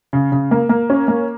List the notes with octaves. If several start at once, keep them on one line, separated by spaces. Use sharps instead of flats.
C#3
C#3
A#3
A#3
C#4
A#3